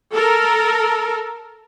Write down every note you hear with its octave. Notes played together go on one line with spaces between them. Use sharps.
A4 A#4